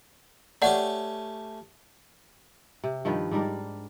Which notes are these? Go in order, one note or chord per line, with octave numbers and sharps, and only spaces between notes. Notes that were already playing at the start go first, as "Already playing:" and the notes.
A3 C#4 G4 D5 F#5
C3
G2 D#3 F3 B4
G#2 G3 D4 A#4